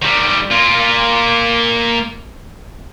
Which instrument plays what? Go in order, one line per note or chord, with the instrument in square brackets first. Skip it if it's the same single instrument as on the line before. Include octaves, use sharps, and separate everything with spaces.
[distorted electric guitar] D#3 G3
A#3 F4